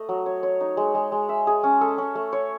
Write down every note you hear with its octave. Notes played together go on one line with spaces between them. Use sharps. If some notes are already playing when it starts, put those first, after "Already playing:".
Already playing: A3 D#5
F#3
C#5
C#5
D#4
G#3
G#3
G#3
E5
G#4
C#4
A4
C#4
A3
C#5